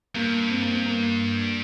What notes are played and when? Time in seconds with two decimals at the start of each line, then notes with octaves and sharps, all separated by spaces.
0.15 G2 A#3
0.50 C4
0.61 A#3
0.73 C4
0.85 A#3